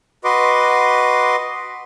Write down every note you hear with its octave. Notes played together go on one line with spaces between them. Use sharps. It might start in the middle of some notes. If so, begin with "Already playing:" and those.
F#4 B4 D#5 C6 D6